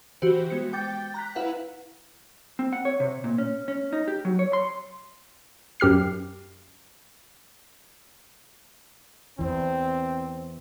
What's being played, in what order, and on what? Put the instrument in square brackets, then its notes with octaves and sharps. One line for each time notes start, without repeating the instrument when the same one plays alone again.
[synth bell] E3 F#4 G4 C5
G#3 B3 C#7
G5 D6 G6 A6
A#5 F#6 B6
E4 B4 F5 F#5
[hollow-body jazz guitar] C4
F#5
C#5
C3
A#2
C#4
C#4
D#4
G4
F#3
C#5
C6
[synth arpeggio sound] F#2 G4 F6 C7
[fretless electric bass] E2 E3 [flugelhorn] C4